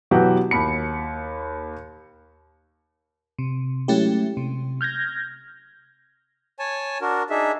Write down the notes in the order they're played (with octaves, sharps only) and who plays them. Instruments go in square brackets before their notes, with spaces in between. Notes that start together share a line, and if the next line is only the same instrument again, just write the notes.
[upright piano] B2 E3 F#3 F#4 G4
D#2 B5 C#7
[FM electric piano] C3
F#3 G#3 A3 C#4 E4 G4
C3
F6 G6 G#6 A#6
[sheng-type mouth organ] C#5 G#5 A5
D4 F#4 A#4
D4 D#4 G#4 E5